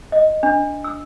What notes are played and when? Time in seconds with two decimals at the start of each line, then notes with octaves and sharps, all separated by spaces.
0.12 D#5
0.43 D4
0.84 E6